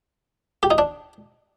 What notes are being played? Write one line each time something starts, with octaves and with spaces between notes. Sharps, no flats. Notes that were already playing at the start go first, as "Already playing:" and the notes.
G4
D#4
D4